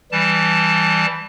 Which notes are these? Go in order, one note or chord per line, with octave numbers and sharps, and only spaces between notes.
E3 G3 A5